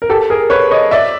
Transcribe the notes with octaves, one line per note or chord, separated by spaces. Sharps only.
A#4
G4 A4
G#4 A#4
B4 C#5
C#5 D#5
D5 E5